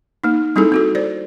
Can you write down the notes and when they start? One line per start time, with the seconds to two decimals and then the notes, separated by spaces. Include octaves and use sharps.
0.24 A#3 D#4
0.56 G3 C4 D#4 E4 G#4 A4
0.72 C4 F#4 A4
0.95 C5 D5